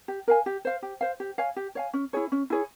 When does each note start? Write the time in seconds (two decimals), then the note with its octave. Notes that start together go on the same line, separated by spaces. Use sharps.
0.08 G4
0.28 A#4 F5 G#5
0.46 G4
0.65 C5 F5
0.82 G4
1.01 C5 F5
1.20 G4
1.38 C#5 F5 G#5
1.56 G4
1.75 C#5 F5 G#5
1.93 C#4
2.13 E4 G#4 C#5
2.32 C#4
2.50 E4 G#4 C#5